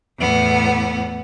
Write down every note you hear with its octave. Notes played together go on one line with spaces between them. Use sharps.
E2 A2 B3